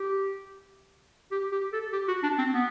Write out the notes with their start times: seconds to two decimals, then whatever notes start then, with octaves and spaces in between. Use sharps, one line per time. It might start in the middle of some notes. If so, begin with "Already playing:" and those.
Already playing: G4
1.32 G4
1.52 G4
1.73 A4
1.93 G4
2.08 F#4
2.23 D4
2.39 C4
2.54 B3